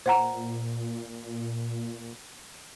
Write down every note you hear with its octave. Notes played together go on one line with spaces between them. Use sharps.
A#2 C5 F#5 A#5